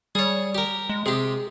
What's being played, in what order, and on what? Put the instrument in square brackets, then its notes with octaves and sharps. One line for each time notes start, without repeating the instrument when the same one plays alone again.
[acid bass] G3 [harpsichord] G#4 C#5
[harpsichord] G4 A#4
[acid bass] G#3
[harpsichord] C3 G4 [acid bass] G#4